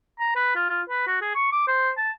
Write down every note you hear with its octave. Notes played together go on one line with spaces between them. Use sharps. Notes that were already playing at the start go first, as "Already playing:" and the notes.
A#5
B4
F4
F4
B4
F#4
G#4
C#6
D6
C5
A5